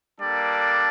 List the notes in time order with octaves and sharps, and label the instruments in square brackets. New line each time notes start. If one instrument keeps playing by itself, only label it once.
[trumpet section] G3 A#3 D4 A4 D5